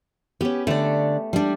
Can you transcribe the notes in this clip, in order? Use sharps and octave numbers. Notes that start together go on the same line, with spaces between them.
B3 C#4 G4
D3 A3 G4 D5
G3 D4